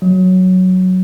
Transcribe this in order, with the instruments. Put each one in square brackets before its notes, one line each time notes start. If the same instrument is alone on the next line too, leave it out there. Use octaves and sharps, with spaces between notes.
[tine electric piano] F#3